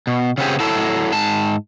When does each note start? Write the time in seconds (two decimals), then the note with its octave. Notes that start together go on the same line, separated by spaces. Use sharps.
0.07 B2
0.38 C#3 B3 C4 G4 G#4
0.60 F#3 E4 A4 A5
1.12 G#2 A5